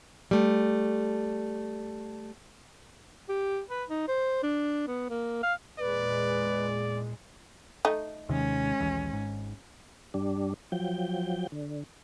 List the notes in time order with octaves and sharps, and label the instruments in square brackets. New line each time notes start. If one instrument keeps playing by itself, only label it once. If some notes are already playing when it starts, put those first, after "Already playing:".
[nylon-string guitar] G3 A3
[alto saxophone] G4
B4
D#4
C5
D4
B3
A#3
F5
[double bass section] E2 A#2 G#3 [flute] B4 [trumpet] D5
[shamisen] A3 D#4
[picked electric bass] D#2 C3 D#3 [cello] G#3 C#4
[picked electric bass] A#1 D#2 E3
G#1 G#2
[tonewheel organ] G2 G3 D4
F3 F#3 G5
D3